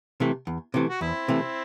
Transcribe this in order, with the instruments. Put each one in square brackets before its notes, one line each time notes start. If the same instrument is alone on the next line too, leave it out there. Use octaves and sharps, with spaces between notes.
[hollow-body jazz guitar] C3 E3 A3
E2
C3 E3 A3
[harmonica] F#4
[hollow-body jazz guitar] E2 [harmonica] C4 E4
[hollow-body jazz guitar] C3 E3 A3